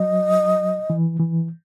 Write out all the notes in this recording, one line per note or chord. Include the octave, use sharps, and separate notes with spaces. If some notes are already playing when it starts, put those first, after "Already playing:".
Already playing: F#3 D#5
E3
E3